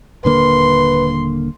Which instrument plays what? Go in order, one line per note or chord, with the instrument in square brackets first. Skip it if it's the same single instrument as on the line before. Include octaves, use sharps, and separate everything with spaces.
[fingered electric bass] D#1 D3 A#3 [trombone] B4 [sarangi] C6